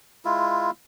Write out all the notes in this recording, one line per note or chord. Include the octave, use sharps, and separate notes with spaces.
G#3 E4 F4